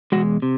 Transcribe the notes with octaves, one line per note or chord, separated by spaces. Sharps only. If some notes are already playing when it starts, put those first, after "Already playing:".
E2 B2 G#3 F#4
C3